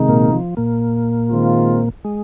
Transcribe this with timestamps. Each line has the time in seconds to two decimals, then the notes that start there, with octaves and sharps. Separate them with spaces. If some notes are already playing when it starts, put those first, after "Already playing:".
Already playing: C3 D#3 G#3 D#4
0.08 A#2 A#3
0.33 F3
0.57 A#2 A#3
1.30 D#3 G#3 C4 F4
2.05 G#3